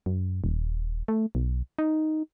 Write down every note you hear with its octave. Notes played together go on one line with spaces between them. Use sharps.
F#2
D#1
A3
B1
D#4